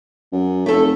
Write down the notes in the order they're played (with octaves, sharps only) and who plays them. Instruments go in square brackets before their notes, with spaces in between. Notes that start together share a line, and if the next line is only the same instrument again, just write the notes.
[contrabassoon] F#2
[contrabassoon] F1 [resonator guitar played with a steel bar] A3 A4